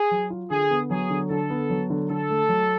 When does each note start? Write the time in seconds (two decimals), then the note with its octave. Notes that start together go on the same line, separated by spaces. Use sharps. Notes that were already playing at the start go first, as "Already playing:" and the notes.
Already playing: G#4
0.11 F#3
0.30 F4
0.51 D3 G#4
0.71 B3
0.90 F#3 G#4
1.10 D3
1.29 D3 A4
1.50 B3
1.70 F#3
1.90 D3
2.09 D3 A4
2.29 A3
2.49 F#3